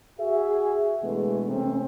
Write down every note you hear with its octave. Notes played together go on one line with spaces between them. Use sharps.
F#4 G#4 E5
B2 D3 E3 G#3 A3 B3
C3 A3 C4 C#4